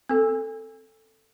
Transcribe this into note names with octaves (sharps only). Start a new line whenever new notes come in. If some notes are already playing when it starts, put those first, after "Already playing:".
C4 A4